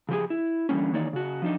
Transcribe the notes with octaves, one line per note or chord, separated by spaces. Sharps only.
C#3 F3 G4 G#4
E4
D3 E3 F3 G3 A#3 C#4
D#3 E3 A#3 D#4 C#5 D5
C#3 F#4
F3 D4 D#4